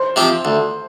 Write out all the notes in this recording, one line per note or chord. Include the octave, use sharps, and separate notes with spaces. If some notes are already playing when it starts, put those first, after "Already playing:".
Already playing: C5
C3 F3 C4 G4
D2